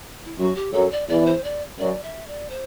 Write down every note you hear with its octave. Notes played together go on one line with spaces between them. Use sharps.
E4
F#2 F#3 F#4
G4
F#2 F#3 A4
D5
E2 E3 D5
C5
D5
F#2 F#3 D5
E5
D5
C5